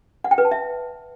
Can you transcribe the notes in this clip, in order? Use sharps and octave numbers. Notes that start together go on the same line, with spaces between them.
F#5
G5
B4
A5
E5